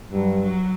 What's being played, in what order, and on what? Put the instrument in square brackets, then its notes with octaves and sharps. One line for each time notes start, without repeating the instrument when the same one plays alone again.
[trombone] G2 [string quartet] F#3
[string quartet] F#3